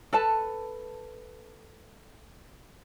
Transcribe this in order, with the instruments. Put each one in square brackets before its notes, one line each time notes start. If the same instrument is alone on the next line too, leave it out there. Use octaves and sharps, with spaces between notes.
[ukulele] A4 B4 A5